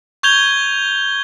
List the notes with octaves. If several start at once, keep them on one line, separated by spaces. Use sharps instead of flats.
C#6 G6 G#6 F7 G7